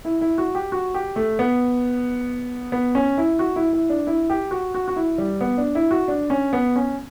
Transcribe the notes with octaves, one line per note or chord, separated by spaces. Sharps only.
E4
E4
F#4
G4
F#4
G4
A3
B3
B3
C#4
E4
F#4
E4
E4
D4
E4
G4
F#4
F#4
F#4
E4
G3
B3
D4
E4
F#4
D4
C#4
B3
C#4